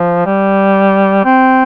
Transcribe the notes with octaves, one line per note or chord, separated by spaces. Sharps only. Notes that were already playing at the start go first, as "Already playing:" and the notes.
Already playing: F3
G3
C4